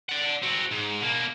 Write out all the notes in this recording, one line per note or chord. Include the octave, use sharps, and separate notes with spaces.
D5 F#5
C4 F#4
G#2
B2 A#3